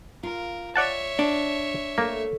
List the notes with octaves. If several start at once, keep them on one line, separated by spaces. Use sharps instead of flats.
F4 A#4
C#5 D5 E5 F#5 A5
D4
A3 A#3